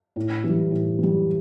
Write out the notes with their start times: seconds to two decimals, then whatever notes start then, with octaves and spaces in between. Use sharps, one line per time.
0.16 A2
0.44 E3 G3
0.71 A2
0.99 E3 G3